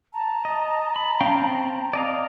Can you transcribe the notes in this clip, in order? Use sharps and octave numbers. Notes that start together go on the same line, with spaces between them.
A5 A#5
D#5
B5
C#4 F5 G5
C4
D5 D#5 F5